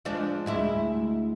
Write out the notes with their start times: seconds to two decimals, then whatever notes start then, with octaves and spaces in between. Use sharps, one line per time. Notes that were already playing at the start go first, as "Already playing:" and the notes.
0.05 F3 G#3 D4
0.46 D2 G#3 E4